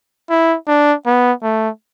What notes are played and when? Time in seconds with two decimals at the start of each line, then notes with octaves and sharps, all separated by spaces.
0.30 E4
0.67 D4
1.06 B3
1.42 A3